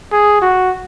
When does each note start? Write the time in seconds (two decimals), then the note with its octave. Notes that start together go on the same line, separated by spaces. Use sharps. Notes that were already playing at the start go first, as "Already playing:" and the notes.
0.12 G#4
0.42 F#4